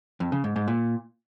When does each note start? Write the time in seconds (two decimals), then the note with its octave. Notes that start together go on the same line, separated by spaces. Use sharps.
0.20 F2
0.32 C#3
0.44 G#2
0.56 G#2
0.68 A#2